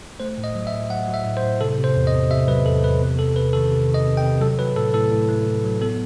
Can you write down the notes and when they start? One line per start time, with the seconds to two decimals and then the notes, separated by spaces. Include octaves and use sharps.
0.20 A3 C5
0.38 A2
0.44 D#5
0.55 F#3
0.67 E5
0.73 A2
0.90 F#3 F#5
1.08 F#3
1.14 E5
1.25 A2
1.37 C5
1.43 A2
1.61 C3 A4
1.78 C3
1.84 C5
1.96 E2
2.07 D#5
2.13 C3
2.30 C3 E5
2.48 F#3 B4
2.66 E2 A4
2.84 E2 B4
3.01 C3
3.18 C3 A4
3.36 C3 B4
3.53 D#3 A4
3.71 C3
3.89 D#3
3.94 D#5
4.06 C3
4.17 G5
4.23 C3
4.41 F#3 A4
4.59 F#3 B4
4.76 A2 A4
4.94 A2 A4
5.11 A2
5.29 A3
5.47 A2
5.64 F#3
5.81 B3 A4